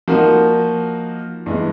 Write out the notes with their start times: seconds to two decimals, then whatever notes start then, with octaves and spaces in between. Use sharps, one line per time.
0.08 F3 A#3 D#4 F#4 A#4
1.46 G2 E3 G#3 B3